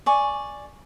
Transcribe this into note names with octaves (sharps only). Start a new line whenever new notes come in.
D5 G#5 C#6